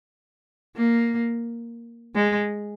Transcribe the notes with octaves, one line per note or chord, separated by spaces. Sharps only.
A#3
G#3